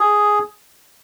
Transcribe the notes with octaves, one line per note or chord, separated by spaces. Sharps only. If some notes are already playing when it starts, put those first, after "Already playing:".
Already playing: G#4